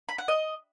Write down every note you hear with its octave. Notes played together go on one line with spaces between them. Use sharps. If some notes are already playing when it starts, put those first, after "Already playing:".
B5
F#5
D#5